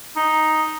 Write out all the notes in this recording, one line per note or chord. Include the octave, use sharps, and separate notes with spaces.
D#4